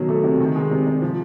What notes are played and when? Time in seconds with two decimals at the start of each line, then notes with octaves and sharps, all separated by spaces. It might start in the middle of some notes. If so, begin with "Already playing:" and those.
Already playing: B2 D#3 F#3
0.09 A3
0.24 C3
0.40 D#3
0.55 G#3
0.71 C3
0.86 C3
1.02 F3